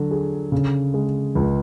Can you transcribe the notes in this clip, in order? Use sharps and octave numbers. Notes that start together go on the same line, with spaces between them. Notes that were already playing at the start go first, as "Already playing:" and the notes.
Already playing: D3 F#3
G#4
C#3
G#3
C#2